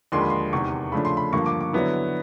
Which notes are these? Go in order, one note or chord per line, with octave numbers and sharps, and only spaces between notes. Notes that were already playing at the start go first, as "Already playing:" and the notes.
D#2 D3 F3 G#3 C6
B5
C6
E2 C3 D#3 C#6
C#3 F3 A3 D4 B5
C6
B5
G2 D3 F3 A#3 C#6
D6
D6
D3 F#3 B3 E4